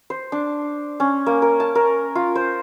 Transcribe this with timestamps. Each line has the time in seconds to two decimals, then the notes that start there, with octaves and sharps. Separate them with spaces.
0.10 C5
0.32 D4
1.00 C#4
1.26 A#3
1.42 A#4
1.60 A5
1.75 A#4
2.15 F4
2.35 C5